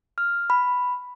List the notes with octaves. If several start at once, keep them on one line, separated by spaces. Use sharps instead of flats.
F6
B5